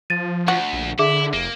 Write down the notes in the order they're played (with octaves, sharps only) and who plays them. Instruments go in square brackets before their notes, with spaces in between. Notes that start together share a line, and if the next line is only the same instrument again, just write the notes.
[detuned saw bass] F3 [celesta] A6 D#7
[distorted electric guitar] D2 [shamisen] F#4
[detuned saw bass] A#1
[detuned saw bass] D3 [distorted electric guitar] E4 [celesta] G#4 E5 D6
[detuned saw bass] F1 [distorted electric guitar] A#3